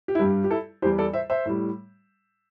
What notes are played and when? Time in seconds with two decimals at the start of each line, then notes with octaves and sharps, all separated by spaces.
0.08 G4
0.15 E4
0.19 G2 G3 G4
0.44 G4
0.51 E4 A4
0.82 E2 E3 G3 G4 C5
0.98 A4 D5
1.13 C5 E5
1.30 C5 E5
1.45 A2 G3